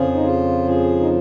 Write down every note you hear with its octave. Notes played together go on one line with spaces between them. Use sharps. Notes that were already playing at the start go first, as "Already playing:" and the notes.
Already playing: F2 C#3 F3 G#4
D#4
F4
G#4
D#4